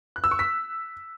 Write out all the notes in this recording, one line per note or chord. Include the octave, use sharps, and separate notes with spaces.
F#6
E6
C#6
B6